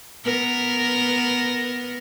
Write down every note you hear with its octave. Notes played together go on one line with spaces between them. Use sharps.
B3 A#4